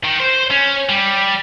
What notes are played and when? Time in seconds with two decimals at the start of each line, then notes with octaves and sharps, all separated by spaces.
0.04 D#3
0.20 C5
0.51 C#4
0.89 G3